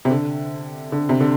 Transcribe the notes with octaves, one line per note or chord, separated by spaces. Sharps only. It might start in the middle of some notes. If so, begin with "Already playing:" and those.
C3
D3
D3
C3
D3